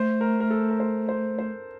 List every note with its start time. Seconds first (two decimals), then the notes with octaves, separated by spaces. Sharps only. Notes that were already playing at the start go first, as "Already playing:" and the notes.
Already playing: A3 C5
0.21 A#4
0.40 A#4
0.50 A4
0.70 A#4
0.80 C5
1.09 C5
1.39 C5